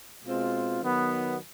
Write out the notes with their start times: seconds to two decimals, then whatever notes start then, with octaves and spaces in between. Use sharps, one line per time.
0.23 B2 G#3 C4 F4
0.81 D#3 F#3 B3